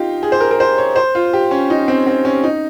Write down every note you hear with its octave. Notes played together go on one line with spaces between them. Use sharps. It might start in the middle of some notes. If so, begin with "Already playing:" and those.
Already playing: D#4 F4 G4
G#4
C5
A#4
A#4
C5
C#5
C5
F4
G4
C#4
D#4
C4
C4
C#4
D#4